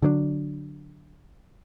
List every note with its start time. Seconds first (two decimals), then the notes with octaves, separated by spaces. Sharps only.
0.02 D3 F#3 B3 D4